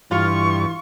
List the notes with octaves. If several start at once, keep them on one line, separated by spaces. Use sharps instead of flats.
G2 E3 F4 C#6